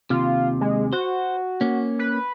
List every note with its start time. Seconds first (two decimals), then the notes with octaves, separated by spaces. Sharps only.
0.10 D#2 C3 F4
0.61 G#3
0.93 F#4 C5
1.61 A#3 C#4
1.99 B4